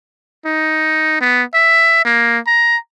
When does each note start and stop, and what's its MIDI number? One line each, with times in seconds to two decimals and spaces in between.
0.46 1.19 63
1.21 1.43 59
1.54 2.02 76
2.05 2.39 58
2.47 2.77 82